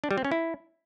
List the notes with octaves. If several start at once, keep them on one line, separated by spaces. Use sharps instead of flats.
D4
G3
C4
C#4
E4